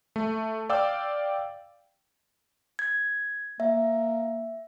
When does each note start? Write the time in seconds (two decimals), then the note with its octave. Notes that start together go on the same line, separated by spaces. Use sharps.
0.16 A3
0.70 D5 F5 G5 D6 E6
2.79 G#6
3.60 A#3 E5